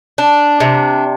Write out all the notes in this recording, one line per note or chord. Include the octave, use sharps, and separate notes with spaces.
D4
C3